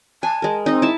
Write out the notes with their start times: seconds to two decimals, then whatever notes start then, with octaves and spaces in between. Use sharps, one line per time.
0.23 G#5 A5
0.42 G#3 A#4
0.66 C4 D#4 D#5
0.82 E4 A5